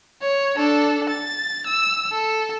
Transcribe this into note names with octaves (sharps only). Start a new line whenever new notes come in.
C#5
D4 A4
A6
E6
A4